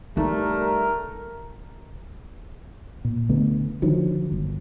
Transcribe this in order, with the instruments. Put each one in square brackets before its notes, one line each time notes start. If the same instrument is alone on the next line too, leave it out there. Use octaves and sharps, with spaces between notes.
[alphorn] G3 [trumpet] A3 [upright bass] D#4 [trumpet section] A#4
[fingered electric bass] A#2
D2 D3 A3 B3
D3 D#3 F3 F#3
G1